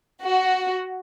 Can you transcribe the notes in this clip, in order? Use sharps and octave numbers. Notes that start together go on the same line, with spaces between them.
F#4